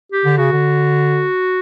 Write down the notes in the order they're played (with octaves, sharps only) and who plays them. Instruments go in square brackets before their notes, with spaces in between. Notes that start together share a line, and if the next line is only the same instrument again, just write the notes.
[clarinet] G4
[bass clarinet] D3
[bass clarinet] C#3 [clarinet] F#4
[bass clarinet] D3